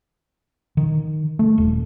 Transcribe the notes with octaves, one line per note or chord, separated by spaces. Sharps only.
D#3
A3
D#1